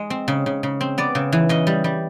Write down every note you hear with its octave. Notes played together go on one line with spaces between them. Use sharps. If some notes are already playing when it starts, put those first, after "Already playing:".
Already playing: G#3
C4
C#3
C#3
C#3
C4
B3 D5
C#3
E3
C#3 D#5
G3
G3